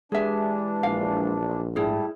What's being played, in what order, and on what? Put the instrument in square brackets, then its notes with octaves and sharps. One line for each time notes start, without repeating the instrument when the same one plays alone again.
[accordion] E3 D4 [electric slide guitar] G#3 G4 G#5 [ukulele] G#4 E5
[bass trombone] A#1 [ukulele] F5
[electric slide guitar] G#2 [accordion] G3 A3 [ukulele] E4 G#4